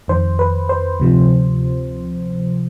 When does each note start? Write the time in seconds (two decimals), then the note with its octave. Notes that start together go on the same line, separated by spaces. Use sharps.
0.08 F2 D#3 C5
0.39 B4
0.69 C5
1.00 D2 C3 F3